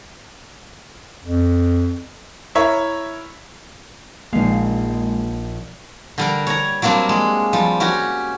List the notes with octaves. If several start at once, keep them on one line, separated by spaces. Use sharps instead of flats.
F2
E4 A#4 C#5 E5
A#1 G#3 A#3 D#4 F5
D3 G3 A#4
C#5 A#5
F#3 G3 A#3 C4 D4 F#4
G#3
F3 G3
C#4 F#4 G4